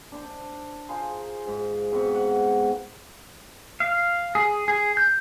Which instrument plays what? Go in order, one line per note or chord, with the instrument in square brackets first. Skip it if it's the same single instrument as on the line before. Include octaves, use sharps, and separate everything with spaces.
[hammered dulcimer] D4 C5 A5
D4
D#4 F4 G#4 C5
G#2
G#2 B2 C4 C#6
F#5
[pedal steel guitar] F5
G#4
G#4
G6